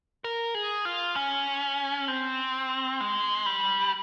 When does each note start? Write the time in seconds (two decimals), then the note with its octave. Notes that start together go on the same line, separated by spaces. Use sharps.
0.24 A#4
0.55 G#4
0.85 F4
1.16 C#4
2.08 C4
3.01 G#3
3.46 G3